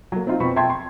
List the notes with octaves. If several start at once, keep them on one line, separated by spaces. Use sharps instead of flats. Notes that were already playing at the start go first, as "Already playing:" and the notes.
F#3 A#3
C4 D#4 F4
F2 B2 C4 B5 C#6
E5 G5 A5 C6 G#6
C6